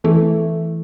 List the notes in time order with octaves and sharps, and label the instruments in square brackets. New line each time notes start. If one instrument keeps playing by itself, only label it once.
[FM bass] E3 [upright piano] A3